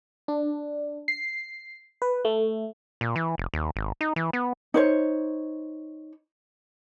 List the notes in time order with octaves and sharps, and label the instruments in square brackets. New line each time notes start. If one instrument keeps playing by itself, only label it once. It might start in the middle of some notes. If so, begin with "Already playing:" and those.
[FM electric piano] D4
C7
B4
A3
[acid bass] A#2
E3
F1
D#2
G#1
D#4
E3
B3
[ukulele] D#4 C5 C#5